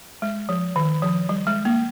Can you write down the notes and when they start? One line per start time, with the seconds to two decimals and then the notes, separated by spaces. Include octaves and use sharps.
0.22 G#3
0.49 F3
0.76 D#3
1.02 F3
1.29 G3
1.47 G#3
1.65 A#3